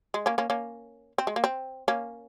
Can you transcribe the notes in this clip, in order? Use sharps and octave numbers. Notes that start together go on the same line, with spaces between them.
G#3
A#3 C#4
A#3 C#4
A#3 C#4
C4
G#3
A#3
C4
A#3 C#4